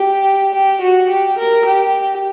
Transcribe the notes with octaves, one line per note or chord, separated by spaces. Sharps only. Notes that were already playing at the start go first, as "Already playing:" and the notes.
Already playing: G4
G4
F#4
G4
A#4
G4